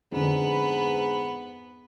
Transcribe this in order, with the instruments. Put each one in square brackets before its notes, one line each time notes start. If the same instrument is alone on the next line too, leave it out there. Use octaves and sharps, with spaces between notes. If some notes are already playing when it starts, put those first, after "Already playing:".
[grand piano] F2 D3 [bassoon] G#2 [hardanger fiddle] B3 B4